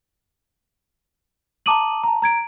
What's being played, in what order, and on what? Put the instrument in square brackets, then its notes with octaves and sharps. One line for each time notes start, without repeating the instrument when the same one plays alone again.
[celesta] A5 A#5 D6 D#6 D#7 F#7
A5 A#5
A#5 G#6 D7